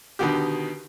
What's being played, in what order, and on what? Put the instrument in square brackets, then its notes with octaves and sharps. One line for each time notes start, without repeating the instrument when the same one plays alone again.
[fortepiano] B2 D3 D#3 F#4 G4